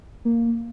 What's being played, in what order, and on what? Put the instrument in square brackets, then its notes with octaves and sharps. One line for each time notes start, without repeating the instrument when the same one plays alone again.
[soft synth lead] A#3